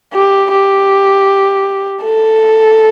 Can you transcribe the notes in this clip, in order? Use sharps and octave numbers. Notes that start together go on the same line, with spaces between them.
G4
G4
A4